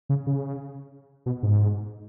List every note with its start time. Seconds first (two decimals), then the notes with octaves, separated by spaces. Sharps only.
0.09 C#3
0.27 C#3
1.26 B2
1.43 G#2